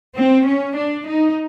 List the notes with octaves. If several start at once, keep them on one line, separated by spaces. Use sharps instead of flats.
C4
C#4
D4
D#4